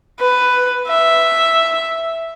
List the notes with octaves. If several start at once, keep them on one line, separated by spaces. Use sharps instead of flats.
B4
E5